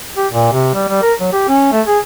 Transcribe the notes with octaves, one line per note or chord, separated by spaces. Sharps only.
G4
A#2
C3
G3
G3
A#4
F#3
G4
C#4
A3
G#4